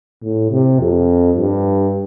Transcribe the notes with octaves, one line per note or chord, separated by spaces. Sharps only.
A2
C3
F2
G2